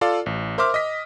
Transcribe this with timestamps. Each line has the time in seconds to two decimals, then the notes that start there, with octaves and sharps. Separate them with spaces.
0.01 F4 A4 D5 F5
0.26 A1
0.58 A#4 C5 E5 C6 D6 F6
0.74 D#5 B6